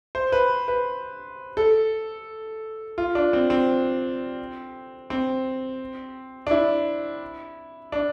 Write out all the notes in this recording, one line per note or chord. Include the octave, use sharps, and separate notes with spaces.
C5
B4
B4
A4
F4
D4
C4
C4
C4
D4
E4
D4